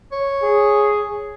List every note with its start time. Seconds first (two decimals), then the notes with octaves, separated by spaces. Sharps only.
0.12 C#5
0.43 G#4